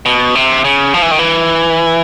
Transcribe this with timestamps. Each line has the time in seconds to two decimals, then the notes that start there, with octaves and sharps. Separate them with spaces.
0.06 B2
0.35 C3
0.64 C#3
0.94 F3
1.02 E3
1.11 D#3
1.19 E3